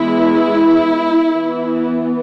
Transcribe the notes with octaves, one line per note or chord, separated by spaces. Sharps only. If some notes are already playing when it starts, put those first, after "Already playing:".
Already playing: E3 G#3 B3 E4
E3 B3